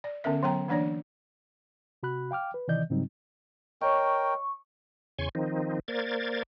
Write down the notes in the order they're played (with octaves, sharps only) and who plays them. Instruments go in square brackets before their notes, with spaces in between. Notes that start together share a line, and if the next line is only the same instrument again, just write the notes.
[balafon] D5
D3 B3 C#4 A#4 E5
F#3 B3 G5 A#5
E3 A#3 D4 C#5 D5
[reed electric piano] C3 F#4 B5 F#6
F5 G5 D6 F6
B4
C3 D#3 E3 D5 D#5 G6
G#2 C#3 F#3 G3 C4 D#4
[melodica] A#4 G5 [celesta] C#5 D#5 [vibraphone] C#6
[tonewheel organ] E2 C#3 C#5 G#5 C6 C#6
D#3 F3 C4 D#4
A#3 A#4 C5 D5 G#6 A6